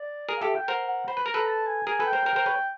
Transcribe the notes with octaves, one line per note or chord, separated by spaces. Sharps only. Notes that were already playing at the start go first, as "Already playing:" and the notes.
Already playing: D5
G#4 A#4
F5
G4 A4 E5
G5
A#4 C5 F#5
F#5
C5 B5
B4
A#4 A#5
A4 B4
A5
G#5
G#4 A#4 G#5
A4 B4
G5
A#4 C5
A#4 C5
A#4 C5
B4 C#5